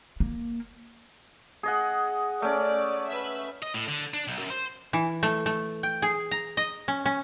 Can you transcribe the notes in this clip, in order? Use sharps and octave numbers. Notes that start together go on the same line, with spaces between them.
A#3
G#4 D#5 F#5
A3 C#4 D5
B4 E5
D#5
A2
D3
D4
B1
F#2
C5
E3
A3
A3
G5
G#4
A#5
D#5
C#4
C#4